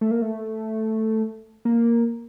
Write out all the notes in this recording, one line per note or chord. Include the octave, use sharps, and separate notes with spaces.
A3
A#3
A3
A#3